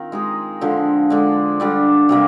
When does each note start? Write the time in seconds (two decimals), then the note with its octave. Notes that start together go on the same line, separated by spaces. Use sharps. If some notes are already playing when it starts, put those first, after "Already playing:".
Already playing: D#3 C4 F4 A#4
0.12 G#3 D#4 G#4
0.61 D3 F3 G#3
1.10 D3 G#3 D4
1.60 D3 G3 D4
2.09 C3 G3 A#3